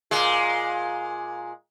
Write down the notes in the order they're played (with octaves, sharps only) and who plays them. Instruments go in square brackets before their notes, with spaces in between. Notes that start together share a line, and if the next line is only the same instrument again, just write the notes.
[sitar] A#2 G#3